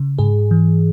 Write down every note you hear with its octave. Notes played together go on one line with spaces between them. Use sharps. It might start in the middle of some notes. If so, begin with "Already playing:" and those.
Already playing: C#3
G#2 G#4
E3